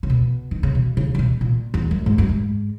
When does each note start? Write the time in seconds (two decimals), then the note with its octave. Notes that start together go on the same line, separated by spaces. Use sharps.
0.03 C#3
0.10 B2
0.51 D#3
0.63 C#3
0.75 B2
0.97 C#3
1.15 C#3
1.19 B2
1.41 A#2
1.74 E2
1.91 F#2
2.06 G#2
2.18 F#2
2.29 G#2